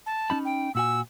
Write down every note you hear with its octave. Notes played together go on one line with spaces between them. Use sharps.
A5
C#4 D#4 B5
G5
A#2 F#4 G#5 E6